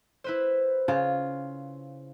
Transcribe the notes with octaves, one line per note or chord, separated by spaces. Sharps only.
E4 B4 C5
C#3 F4